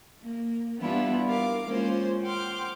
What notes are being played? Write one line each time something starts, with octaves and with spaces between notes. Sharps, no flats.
A#3
E3 G3 B3 D4 E4 F4
A#4 F5 D6
G#3 A#3 C#4 F4 C5
F#5 G5 C6 D6 F6